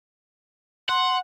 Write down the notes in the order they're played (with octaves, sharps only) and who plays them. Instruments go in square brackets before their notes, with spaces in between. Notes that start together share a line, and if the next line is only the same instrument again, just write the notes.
[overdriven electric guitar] F#5 [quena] C6